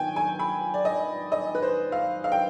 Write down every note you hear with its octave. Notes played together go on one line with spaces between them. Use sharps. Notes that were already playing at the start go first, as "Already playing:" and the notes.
Already playing: D#3 B3 F4 G5 G#5
G#5
B5
D5
D#5
D#5
B4
C5
F5
F5
G5